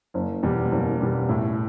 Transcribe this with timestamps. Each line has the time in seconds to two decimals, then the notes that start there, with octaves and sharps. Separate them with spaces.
0.14 F#1
0.43 E2 B2 G3
0.72 F#1
1.01 E2 B2 G3
1.29 A2